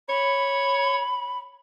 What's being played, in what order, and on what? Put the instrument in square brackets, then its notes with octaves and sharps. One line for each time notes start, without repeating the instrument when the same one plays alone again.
[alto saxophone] C#5 [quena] B5